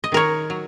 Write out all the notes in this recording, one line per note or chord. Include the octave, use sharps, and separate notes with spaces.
D#5
D#3 A#4 C#5
F#3